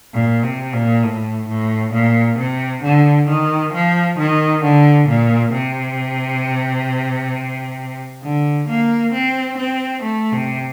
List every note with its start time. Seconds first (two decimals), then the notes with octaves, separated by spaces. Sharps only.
0.14 A#2
0.43 C3
0.73 A#2
1.04 A2
1.48 A2
1.93 A#2
2.38 C3
2.83 D3
3.28 D#3
3.73 F3
4.18 D#3
4.63 D3
5.08 A#2
5.53 C3
8.23 D3
8.68 A#3
9.13 C4
9.57 C4
10.02 A3
10.32 C3